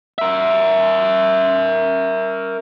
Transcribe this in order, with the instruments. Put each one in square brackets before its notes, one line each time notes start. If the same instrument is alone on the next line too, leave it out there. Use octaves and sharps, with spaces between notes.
[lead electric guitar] A#4 E5